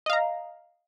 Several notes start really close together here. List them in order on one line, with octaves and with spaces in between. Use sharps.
D#5 F5 A#5